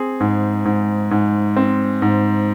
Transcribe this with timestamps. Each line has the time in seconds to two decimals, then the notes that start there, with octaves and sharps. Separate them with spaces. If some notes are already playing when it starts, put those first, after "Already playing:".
Already playing: C4 G#4
0.20 G#2
0.65 G#2
1.11 G#2
1.56 C4
2.02 G#2